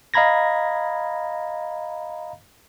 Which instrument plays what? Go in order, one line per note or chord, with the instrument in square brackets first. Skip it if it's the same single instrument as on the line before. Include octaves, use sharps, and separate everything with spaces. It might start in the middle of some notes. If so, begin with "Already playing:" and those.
[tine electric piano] D#5 F5 A#5 B5 G#6 A#6